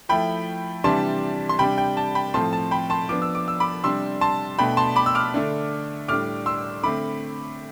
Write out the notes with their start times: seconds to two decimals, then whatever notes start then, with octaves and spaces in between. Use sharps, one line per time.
0.09 F3 A3 E4 G5 B5
0.84 C3 E3 G3 D4 A5 C6
1.49 C6
1.59 C3 G3 D4 G5 B5
1.78 G5
1.97 A5
2.15 G5 B5
2.34 A2 F3 A3 C4 A5 C6
2.53 A5
2.71 G5 B5
2.90 A5 C6
3.09 F3 B3 D4 D6
3.22 E6
3.35 D6
3.48 E6
3.60 B5 D6
3.84 C3 G3 D4 C6 E6
4.21 A5 C6
4.59 B2 A3 D4 G5 B5
4.77 A5 C6
4.96 B5 D6
5.06 E6
5.15 D6 F6
5.34 D3 A3 D4
6.08 A2 G3 D4 D6 F6
6.46 C6 E6
6.83 D3 A3 C4 B5 D6